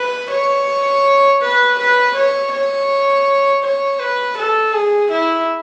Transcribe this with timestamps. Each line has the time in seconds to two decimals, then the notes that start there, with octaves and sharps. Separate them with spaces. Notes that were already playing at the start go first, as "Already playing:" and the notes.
Already playing: B4
0.31 C#5
1.41 B4
1.78 B4
2.15 C#5
2.52 C#5
3.63 C#5
3.99 B4
4.37 A4
4.74 G#4
5.10 E4